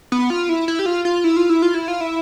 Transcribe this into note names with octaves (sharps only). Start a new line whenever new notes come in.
B3
F4
E4
E4
G4
F4
F4
E4
F4
E4
F4
E4
F4
E4